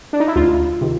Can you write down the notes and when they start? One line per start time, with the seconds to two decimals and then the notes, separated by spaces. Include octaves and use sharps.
0.13 D4
0.20 D#4
0.28 E4
0.36 D2 F4
0.81 C3 D#3